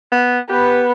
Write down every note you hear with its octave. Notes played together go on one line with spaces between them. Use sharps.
B3
B3 G4 B4